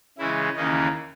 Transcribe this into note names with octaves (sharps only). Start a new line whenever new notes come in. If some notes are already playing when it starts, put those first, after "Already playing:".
C#3 E3 G#3 C#4 E4
D#2 C#3 E3 A#3 C#4 D#4